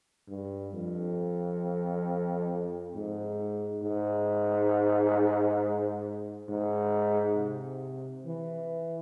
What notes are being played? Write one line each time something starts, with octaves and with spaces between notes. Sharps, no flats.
G2
F2
G#2
G#2
G#2
C3
E3